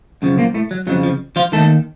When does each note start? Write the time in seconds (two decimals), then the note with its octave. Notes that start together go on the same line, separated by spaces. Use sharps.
0.22 F#2 C#3 F3
0.38 A#2 A#3
0.54 A2 A3
0.71 F#3
0.87 F2 C#3 F3 F#3
1.03 F3
1.36 F3 F4
1.52 D#2 D#3 A3 A4